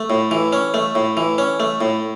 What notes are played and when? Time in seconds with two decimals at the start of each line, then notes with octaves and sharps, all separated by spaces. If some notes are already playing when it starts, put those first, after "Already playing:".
Already playing: A3
0.10 A2
0.31 E3
0.53 C#4
0.74 A3
0.95 A2
1.17 E3
1.38 C#4
1.60 A3
1.81 A2